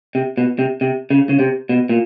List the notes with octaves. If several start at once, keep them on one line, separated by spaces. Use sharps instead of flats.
C3
B2
C3
C3
C#3
C#3
C3
B2
A#2